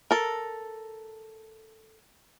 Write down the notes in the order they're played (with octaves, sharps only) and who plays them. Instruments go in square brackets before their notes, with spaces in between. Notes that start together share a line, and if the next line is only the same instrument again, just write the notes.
[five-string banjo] A4 A#4